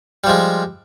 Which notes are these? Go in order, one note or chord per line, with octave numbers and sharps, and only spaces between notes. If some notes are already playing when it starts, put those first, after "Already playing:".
F3 G3 G#3